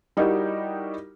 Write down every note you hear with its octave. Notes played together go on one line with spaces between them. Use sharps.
G3 D#4 E4 F#4 G4 A#4